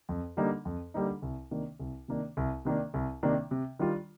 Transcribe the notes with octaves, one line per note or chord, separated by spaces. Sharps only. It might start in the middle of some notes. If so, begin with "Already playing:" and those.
F2
D3 G3 A#3 D#4
F2
D3 G3 A#3 D#4
C2
C3 D#3 A#3 D4
C2
C3 D#3 A#3 D4
C2
C3 D#3 A#3 D4
C2
C3 D#3 A#3 D4
C3
D#3 G3 D4 F4